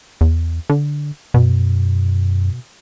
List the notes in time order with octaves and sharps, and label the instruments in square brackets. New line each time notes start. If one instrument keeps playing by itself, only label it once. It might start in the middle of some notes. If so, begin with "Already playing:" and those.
[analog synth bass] E2
D3
[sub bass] F#2 [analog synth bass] B2